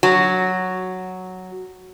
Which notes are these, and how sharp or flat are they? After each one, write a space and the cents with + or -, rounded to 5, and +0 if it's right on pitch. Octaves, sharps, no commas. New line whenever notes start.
F#3 +0 F#4 +0